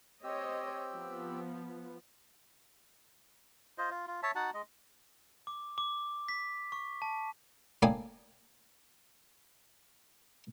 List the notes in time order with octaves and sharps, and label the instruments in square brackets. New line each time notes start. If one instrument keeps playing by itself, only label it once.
[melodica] C4 G4 E6 [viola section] C5 C#5 D#5
[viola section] F3 B3
[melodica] F4 C5 D#5
F4
F4
C#5 E5 A5
D#4 F#4 F#5 A5
G#3 D#5
[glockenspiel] D6
D6
B6
C#6
A5
[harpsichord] A2 A#3 D4 G5 G#5 D#6